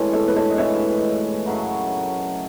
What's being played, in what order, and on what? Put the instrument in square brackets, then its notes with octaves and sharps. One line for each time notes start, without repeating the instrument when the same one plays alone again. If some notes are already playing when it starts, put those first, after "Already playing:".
Already playing: [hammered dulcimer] A2 E3 G#3 [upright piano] A4 C#5
[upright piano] A4 C#5
B4
A4 C#5
D#5
[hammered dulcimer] A2 E3 G#3 [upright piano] C#5 E5
[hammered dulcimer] F#2 C#3 F#3 A3